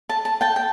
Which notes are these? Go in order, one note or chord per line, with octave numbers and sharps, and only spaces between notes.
A5
A5
G5 A5
G5